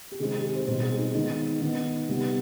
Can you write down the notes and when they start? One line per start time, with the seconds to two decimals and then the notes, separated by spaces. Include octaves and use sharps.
0.12 G4
0.19 C3 D#3 G#3 C4 G#4
0.31 G4
0.43 G#4
0.55 C5
0.67 B2 G3 C4 C5
0.82 G#4
0.98 D#4
1.14 D#3 G#3 B3 D#4
1.61 D#3 B3
2.08 C3 G3 B3